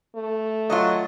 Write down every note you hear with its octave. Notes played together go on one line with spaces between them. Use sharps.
A3
F#3 F4 A4 D#5